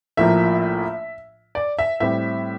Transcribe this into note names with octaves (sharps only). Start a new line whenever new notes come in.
A#1 A2 F3 A#3 E5
D5
E5
A2 G3 C4 E5